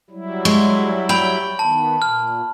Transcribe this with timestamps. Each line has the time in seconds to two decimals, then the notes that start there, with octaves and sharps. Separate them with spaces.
0.10 F#3 G3 E4
0.45 G#3 C#6
1.09 G5 B5 F#7
1.59 D#3 B3 A5
2.02 A#2 F6